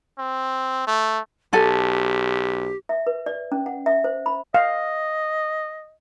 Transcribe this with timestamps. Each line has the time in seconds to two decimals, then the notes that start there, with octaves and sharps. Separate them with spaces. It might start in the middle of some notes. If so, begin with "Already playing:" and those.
0.18 C4
0.87 A3
1.53 B1 G4 A4 G#5
2.89 E5
3.07 B4
3.26 D5
3.52 C#4
3.66 F#5
3.86 E5
4.04 C5
4.26 B5
4.54 D#5 F5